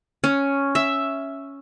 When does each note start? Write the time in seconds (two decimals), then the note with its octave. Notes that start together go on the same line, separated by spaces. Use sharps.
0.24 C#4
0.75 E5